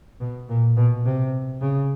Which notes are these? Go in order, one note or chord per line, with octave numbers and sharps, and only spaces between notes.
B2
A#2
B2
C3
C#3